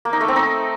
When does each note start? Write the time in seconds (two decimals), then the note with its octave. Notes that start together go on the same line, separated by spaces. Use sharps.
0.05 A#3
0.13 D#4
0.21 A3
0.28 C4
0.36 D#4